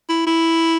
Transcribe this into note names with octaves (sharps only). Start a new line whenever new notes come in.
E4
E4